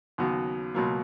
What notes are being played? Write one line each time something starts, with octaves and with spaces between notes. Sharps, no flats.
D#2 C#3 F#3 B3 F#4
C#2 B2 F#3 A#3